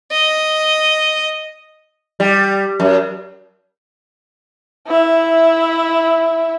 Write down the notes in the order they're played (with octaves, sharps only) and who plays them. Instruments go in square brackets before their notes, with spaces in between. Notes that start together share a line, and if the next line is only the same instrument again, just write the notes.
[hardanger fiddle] D#5
[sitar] G3
F#2
[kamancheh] E4 E5